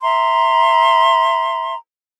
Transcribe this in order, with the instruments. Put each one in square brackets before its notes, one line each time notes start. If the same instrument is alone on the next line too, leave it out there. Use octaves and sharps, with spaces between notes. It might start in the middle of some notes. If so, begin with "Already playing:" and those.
[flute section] E5 A#5 C6